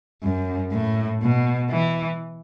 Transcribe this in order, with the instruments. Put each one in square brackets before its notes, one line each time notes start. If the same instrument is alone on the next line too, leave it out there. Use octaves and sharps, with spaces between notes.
[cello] F#2
A2
B2
E3